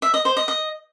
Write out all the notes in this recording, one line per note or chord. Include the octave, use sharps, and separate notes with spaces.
E5
D#5
C5
D#5
D#5